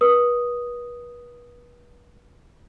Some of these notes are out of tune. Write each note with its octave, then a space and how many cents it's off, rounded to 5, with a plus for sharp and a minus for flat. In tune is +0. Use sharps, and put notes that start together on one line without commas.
B4 -35 D#6 +0